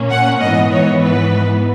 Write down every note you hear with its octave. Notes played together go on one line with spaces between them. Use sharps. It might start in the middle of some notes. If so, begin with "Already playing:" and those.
Already playing: A#2 A#3 C#4
F#5
G#2 E3 B3 D#5
C#5
B4